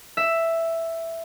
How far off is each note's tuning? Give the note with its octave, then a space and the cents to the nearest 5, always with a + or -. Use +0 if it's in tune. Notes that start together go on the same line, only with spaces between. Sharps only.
E5 +5